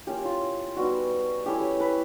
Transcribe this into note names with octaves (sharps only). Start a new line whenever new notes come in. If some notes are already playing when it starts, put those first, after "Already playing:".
A#3 C#4 F4 G4
F4
G3 B3 D#4 F#4
A3 C#4 E4 G4
B4